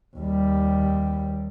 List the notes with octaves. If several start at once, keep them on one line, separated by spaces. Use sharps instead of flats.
D#2 G3